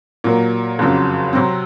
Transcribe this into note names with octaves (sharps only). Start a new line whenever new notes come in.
A#2 F#3 A#3
F#1 F2 C#3 F#3
C3 F#3 C4